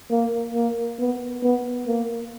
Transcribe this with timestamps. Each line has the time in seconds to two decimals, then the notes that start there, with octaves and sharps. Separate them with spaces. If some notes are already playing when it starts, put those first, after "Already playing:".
0.11 A#3
0.54 A#3
0.99 B3
1.43 B3
1.87 A#3